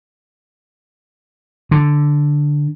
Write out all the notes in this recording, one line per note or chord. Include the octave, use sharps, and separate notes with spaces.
D3